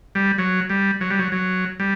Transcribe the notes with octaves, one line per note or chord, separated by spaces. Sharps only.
G3
F#3
G3
F#3
G3
F#3
F#3
G3